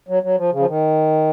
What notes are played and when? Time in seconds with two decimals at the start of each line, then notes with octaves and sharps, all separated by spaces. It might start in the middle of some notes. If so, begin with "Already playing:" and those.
0.09 F#3
0.23 F#3
0.37 F3
0.52 C#3
0.59 F3
0.68 D#3